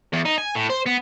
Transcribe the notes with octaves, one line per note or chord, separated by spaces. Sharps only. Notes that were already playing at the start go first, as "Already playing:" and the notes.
E2
D#4
G#5
A2
C5
B3